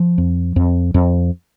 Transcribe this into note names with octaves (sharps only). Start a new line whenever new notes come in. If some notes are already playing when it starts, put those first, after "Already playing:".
Already playing: F3
F2
F2
F2